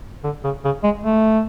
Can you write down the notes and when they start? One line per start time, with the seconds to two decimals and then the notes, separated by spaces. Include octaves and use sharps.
0.24 D3
0.44 C#3
0.64 C#3
0.84 G#3
1.04 A3